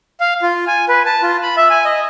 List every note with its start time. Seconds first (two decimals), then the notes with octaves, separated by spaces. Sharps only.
0.20 F5
0.42 F4
0.67 G#5
0.89 B4
1.06 A5
1.22 F4
1.43 B5
1.57 E5
1.70 G#5
1.85 D#5